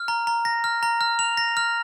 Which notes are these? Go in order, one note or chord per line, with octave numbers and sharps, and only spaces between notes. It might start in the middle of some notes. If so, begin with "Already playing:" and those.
Already playing: F6
A#5
A#5
A#6
F6
A#5
F6
F7
A#6
F6